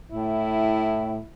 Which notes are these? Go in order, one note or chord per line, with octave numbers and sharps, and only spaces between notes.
A2 E4